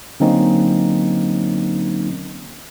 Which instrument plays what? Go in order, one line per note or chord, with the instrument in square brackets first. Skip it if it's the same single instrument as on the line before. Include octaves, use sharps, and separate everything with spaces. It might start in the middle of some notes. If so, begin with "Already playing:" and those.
[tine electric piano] D3 F#3 A#3 C4 C#4 D#4